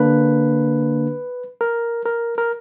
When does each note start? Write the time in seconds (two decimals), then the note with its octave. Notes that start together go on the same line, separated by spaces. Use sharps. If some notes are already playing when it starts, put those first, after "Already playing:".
Already playing: D3 A#3 D4 B4
1.61 A#4
2.05 A#4
2.38 A#4